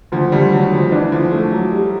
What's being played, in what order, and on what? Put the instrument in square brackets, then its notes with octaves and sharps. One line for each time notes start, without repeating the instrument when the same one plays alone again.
[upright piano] D2 [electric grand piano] F3
[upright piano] D2 [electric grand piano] G3
[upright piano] D2 [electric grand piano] F#3
[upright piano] D2 [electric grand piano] F3
[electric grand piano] E3 [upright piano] D4
[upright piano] D3 [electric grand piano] F3
[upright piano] A3
F#3
G3